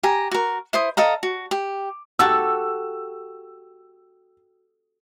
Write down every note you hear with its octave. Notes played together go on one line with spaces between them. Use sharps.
G4 G#5 A#5
F#4 A#4
E4 C5 D#6
A4 D#5 F5 A#5
F#4
G4
F#4 G4 A4 E6